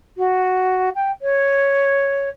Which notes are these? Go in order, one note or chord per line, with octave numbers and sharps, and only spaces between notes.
F#4
G5
C#5